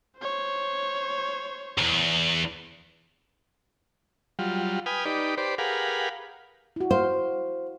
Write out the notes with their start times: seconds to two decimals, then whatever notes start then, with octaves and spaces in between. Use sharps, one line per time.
0.18 C5 C#5
1.78 B1 E2
4.39 F#3 G3 F4
4.86 B4 G5 G#5 D#6 F6
5.05 D#4 G4 B4 D5
5.37 G4 B4 C5 D5
5.58 G4 G#4 A#4 B4 F5 F#5
6.76 E4 F#4
6.91 C5 F5